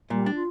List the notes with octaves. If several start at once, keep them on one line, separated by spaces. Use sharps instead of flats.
A#2 G3
D4
F4